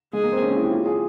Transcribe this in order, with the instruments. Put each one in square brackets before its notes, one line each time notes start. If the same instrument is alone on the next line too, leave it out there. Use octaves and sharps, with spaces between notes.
[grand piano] G#3 [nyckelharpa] G#4
[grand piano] A#3
C4
C#4
E4
G4
F4
G#4